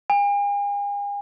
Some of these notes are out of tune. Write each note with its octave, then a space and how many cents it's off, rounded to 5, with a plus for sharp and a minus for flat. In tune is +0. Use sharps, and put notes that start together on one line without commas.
G#5 -40